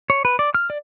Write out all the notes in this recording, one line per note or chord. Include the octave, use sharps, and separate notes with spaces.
C#5
B4
D5
F6
D5